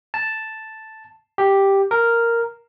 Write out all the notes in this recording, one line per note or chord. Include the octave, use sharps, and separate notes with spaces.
A5
G4
A#4